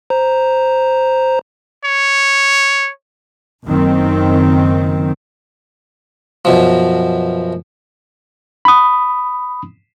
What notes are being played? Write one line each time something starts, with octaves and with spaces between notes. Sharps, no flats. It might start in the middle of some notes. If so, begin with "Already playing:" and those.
C5 A#5
C#5
F#1 F#2 D#3 C4
F#2 B2 F3
B5 D#6